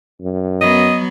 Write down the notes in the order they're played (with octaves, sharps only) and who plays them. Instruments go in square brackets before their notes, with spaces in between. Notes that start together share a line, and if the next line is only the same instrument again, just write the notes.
[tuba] F#2
[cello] F#3 B3 [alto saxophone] D#5